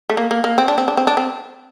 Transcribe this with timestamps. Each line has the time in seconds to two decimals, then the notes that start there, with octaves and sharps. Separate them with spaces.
0.10 A3
0.17 A#3
0.31 A#3
0.44 A#3
0.58 C4
0.68 D4
0.78 C4
0.88 D4
0.97 C4
1.07 D4
1.17 C4